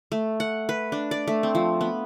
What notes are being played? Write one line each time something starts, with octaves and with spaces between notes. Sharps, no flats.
A3
F#5
B4
D4
D5
A3
C4
F3
B3